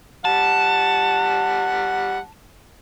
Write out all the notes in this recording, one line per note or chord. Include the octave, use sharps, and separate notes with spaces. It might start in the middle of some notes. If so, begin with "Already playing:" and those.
G3 F#5 A5